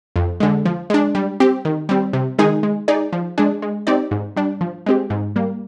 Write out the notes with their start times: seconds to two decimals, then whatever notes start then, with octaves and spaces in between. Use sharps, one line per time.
0.16 F2
0.40 D3 G#3
0.66 F3
0.90 G#3 D4
1.15 G3
1.40 C4 G4
1.65 D#3
1.89 G3 C4
2.13 C3
2.38 D#3 G#3 D#4 G#4
2.63 G#3
2.88 D#4 G#4 D5
3.13 F3
3.38 G#3 D4 G#4
3.62 G#3
3.87 C4 D#4 G4 D5
4.11 G#2
4.36 G3 D4
4.61 F3
4.86 G#3 C4 G4
5.10 G#2
5.36 G3 A#3